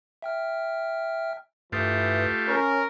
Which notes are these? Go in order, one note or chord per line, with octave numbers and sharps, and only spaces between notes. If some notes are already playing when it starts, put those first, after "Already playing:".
E5 G5 F6
G2 E3 A3 F4 G4 D#6
C#4 A#4 C#6